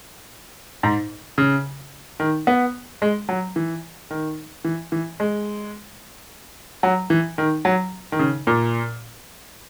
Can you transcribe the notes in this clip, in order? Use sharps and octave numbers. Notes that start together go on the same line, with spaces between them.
G#2
C#3
D#3
B3
G#3
F#3
E3
D#3
E3
E3
G#3
F#3
E3
D#3
F#3
D#3
C#3
A#2